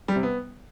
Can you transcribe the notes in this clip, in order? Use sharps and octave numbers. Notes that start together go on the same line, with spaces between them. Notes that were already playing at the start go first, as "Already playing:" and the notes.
G3
C3
B3